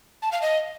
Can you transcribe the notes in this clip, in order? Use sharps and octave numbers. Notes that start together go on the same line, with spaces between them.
A5
F5
D#5